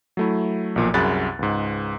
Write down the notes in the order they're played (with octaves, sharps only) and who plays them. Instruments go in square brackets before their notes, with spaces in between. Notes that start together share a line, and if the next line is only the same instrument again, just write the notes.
[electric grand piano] F#3 A3 E4
B1 A#2 F3
C2 F#2 G#4 B5 F#6 A6
C#2 G#2